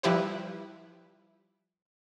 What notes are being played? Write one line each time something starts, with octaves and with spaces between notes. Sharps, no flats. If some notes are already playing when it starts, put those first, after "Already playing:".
F3 G3 E4 G4 B4 C5